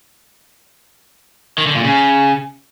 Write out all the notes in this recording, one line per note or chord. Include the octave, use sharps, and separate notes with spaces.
D#3
D3
A#2
C#3